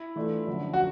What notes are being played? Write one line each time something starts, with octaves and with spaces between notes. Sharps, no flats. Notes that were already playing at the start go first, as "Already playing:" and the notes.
Already playing: E4
E3 A3 D4 F4
F#2 D3 F3
F#4